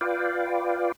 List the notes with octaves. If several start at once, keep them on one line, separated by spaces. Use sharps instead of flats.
F4 B4 D5 F5 G5